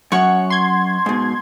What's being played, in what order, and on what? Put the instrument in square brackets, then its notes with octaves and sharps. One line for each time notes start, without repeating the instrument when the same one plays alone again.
[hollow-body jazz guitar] F#2 [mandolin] C#5 F#5 C#6
[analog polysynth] C6 G#6
[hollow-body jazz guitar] G#2 B2